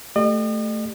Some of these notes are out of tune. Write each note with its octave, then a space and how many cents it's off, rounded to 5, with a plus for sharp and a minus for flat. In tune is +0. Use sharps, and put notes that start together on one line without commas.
A3 +0 G4 +0 D#5 -45